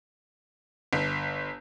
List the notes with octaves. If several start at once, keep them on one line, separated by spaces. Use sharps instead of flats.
G1